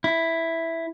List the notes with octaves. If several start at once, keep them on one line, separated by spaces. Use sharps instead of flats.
E4